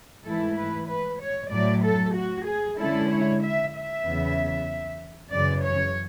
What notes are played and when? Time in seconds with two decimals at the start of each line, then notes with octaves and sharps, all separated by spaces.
0.25 G#2 E3 A3 E4 A4
0.56 B4
0.88 B4
1.20 C#5
1.51 A2 F#3 A3 D5
1.84 A4
2.15 F#4
2.47 G#4
2.78 D3 G#3 C#4 E4 A4
3.10 C#5
3.42 E5
3.73 E5
4.05 E2 C#3 F#3 B3
5.32 F#2 C#3 E3 D5
5.63 C#5